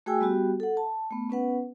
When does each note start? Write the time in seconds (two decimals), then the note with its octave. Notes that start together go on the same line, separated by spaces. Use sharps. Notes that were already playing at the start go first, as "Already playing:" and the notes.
0.06 A3 F#4 G#4 G5 G#5 E6
0.21 G3 B3 F#4 G4
0.60 A4 F#5
0.77 A5
1.11 A3 B3
1.30 B3 C#4 B4 F#5